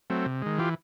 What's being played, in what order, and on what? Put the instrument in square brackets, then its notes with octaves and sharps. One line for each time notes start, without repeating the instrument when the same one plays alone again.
[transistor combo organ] F#3 A3 C4
C3
D#3 G#3
E3 F4 G4